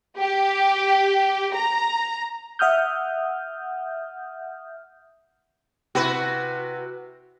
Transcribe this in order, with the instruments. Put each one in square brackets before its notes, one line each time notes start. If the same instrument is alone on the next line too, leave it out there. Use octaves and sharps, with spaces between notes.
[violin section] G4
A#5
[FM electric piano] E5 F#5 D#6 F6 G6
[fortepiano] C3 E4 [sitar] F#4 B4